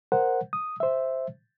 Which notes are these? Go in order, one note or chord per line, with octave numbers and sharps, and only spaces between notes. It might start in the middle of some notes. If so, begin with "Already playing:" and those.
A#4 C5 F#5
D#6
C5 E5